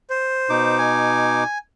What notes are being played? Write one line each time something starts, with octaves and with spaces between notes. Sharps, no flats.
C5
B2 D#4 D6
G#5